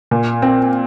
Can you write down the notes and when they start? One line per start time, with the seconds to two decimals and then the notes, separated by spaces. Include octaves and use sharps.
0.11 A#2
0.42 C4